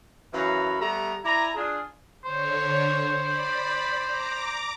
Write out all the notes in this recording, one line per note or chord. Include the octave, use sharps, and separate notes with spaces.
F#2 E3 C#5 F5 A#5 B5
G3 A3 B3 A#5
E4 D5 G#5 A#5
D4 F4 G#4
D3 C5 C#5
D5 B5
A#5 D6